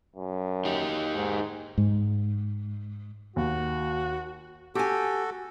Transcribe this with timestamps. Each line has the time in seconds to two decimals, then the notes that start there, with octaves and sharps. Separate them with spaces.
0.16 F#2
0.65 D#4 G4
1.15 G#2
1.78 G#2
3.36 D#2 F#4
4.75 F#4 G4 A4 G#5